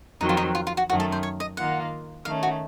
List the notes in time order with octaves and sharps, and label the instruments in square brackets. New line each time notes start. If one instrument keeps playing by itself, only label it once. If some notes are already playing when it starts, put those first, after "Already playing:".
[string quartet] F2 D#3 F#3 C4 [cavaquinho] D#4
[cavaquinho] F4
D#4
F4
F4
F#4
[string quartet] F#2 D#3 A3 C#4 [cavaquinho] F#4
[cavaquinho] A4
C5
C#5
D#5
[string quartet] D#3 A#3 F4 [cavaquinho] F#5
[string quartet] D#3 A3 C#4 [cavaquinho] F5
[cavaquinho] F#4